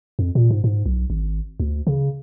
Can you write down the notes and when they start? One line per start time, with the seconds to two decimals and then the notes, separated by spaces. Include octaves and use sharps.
0.19 F2
0.35 A#2
0.51 G#2
0.64 G#2
0.86 B1
1.10 G#1
1.60 D2
1.87 C#3